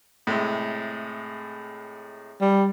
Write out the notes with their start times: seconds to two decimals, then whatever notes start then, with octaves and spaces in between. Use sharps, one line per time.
0.27 A2 C3 G#3
2.41 G3